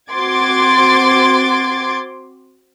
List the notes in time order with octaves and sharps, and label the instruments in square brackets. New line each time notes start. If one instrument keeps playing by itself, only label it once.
[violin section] C4 F#4 C6 D6 G#6 A6